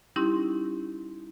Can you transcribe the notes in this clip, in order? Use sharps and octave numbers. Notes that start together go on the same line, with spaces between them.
G3 C#4 D#4 E4 G4 C6